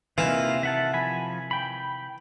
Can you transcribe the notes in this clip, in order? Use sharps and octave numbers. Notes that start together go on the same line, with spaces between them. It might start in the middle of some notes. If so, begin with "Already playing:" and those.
C3 D#3 E3 A#3 F4
E5 F#5 A5
F3 G#5 B5
G5 B5